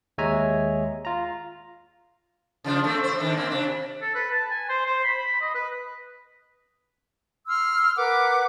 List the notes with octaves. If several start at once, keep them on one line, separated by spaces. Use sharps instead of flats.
D#2 G#3 C#5 E5 G#5 A#5
F4 A#5
C#3 F3 D4
A3 C4
A2 C5
D#3 D4
A#3 C4
C3 D4
A4
B4
A5
G#5
C5
C5
B5
B5
D#5
B4
C6 E6 F6
A#4 B4 F#5 D6